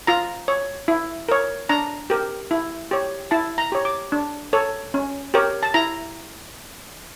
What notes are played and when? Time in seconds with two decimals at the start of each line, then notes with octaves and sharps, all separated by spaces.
0.07 F4 A#5
0.48 C#5
0.88 E4
1.29 A#4 C#5
1.69 D4 A#5
2.10 G4 A#4
2.51 E4
2.91 G4 C#5
3.31 E4 A5
3.58 A#5
3.72 G4 C#5
3.85 D6
4.12 D4
4.53 A4 C#5
4.94 C#4
5.34 G4 A#4 C#5
5.63 A5
5.74 E4 A#5